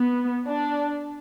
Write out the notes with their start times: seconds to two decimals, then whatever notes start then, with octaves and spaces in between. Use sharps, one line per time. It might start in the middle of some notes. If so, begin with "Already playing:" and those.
Already playing: B3
0.47 D4